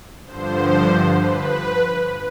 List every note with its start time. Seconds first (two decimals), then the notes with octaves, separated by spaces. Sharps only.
0.24 G2 D3 F3 C5
1.14 B4